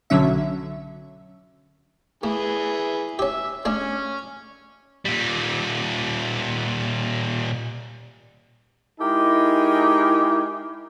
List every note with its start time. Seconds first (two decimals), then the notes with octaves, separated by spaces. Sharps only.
0.10 B1 D3 F#3 C#4 E5
2.23 E3 A3 G#4
3.19 C#4 G4 E5
3.65 A3 C#4 D4 G#4
5.05 A#2 G3
9.01 G#3 D#4 E4 G4 G#4 A#4